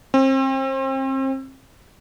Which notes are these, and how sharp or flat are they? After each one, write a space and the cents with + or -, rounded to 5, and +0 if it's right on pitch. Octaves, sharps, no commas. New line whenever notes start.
C4 +35